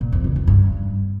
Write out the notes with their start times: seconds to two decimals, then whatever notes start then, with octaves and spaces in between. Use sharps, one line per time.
0.01 A#2
0.12 F2
0.24 C#3
0.36 F2
0.47 G2